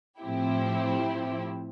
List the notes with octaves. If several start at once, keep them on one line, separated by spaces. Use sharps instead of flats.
A2 F3 C4 E4 G4